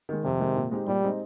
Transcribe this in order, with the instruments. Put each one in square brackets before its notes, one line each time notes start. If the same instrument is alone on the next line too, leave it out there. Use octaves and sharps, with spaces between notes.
[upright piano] D#3 G#3
[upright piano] F2 [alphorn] C3
[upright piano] D#3 G#3
A#2
G#3 C4 D#4 G4
[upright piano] A#2 [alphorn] G3
[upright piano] G#3 C4 D#4 G4